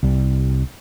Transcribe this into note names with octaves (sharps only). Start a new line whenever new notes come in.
C2 G3